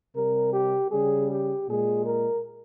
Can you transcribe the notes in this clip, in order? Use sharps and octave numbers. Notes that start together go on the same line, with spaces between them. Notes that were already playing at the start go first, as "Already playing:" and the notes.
C3 G3 A#4
G4
C#3 G3 G#4
G4
A#2 G#3 G#4
A#4